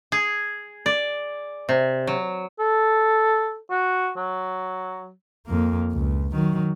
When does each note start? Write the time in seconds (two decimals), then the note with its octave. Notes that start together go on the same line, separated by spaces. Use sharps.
0.12 G#4
0.86 D5
1.69 C3
2.07 F#3
2.60 A4
3.70 F#4
4.17 F#3
5.46 F2 A#3
5.93 C#2
6.32 D#3 F#3